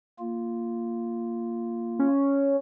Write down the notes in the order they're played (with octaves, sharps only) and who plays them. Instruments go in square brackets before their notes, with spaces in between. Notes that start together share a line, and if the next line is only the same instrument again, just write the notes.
[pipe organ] A#3 F4
[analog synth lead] C#4